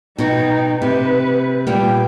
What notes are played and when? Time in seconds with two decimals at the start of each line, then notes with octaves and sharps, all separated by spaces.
0.18 B2 D#4 F#4 G5
0.82 C3 B4
1.67 A#2 G3 B3 G5